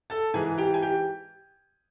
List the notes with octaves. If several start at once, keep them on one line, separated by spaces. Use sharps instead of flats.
A4 A5
G#2 E3 G#4 G#5
G4 G5
G#5
G4 G5